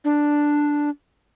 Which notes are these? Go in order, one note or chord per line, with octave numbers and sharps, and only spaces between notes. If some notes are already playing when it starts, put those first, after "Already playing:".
D4